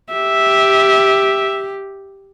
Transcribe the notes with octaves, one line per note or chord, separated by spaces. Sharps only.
G4 E5